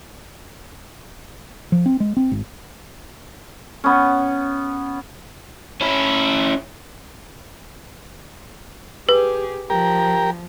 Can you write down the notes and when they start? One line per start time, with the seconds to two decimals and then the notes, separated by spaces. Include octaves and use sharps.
1.72 F3
1.86 C4
2.00 G#3
2.17 C4
2.32 G#1
3.84 B3 C#4
5.81 C#4 E4
9.09 G4 G#4 B4
9.70 F3 G4 A#4